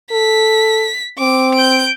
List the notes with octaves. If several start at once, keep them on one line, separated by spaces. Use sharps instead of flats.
A4 B6
C4 D6
G6 D7